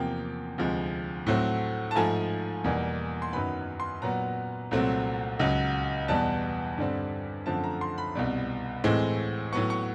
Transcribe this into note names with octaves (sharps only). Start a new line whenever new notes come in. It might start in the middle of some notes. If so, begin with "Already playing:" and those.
Already playing: E2 C3 F3 A#3 G5
D2 C3 F3 G#3
A2 F#3 A3 C4
A5
G#2 F3 A3 G#5
E2 B2 G3 A#3
C6
F#2 D#3 F#3 B3 B5
C6
A#2 F#3 B3 A#5
C2 A#2 F#3 A3 C4
C#2 C#3 F#3
E2 B2 G3 B3 A5
G2 D3 G3 C4
F#2 D3 F3 A3 C4 A5
A#5
C6
B5
C2 B2 G3
A2 E3 G#3 C4
A2 F#3 B3 C#6
C#6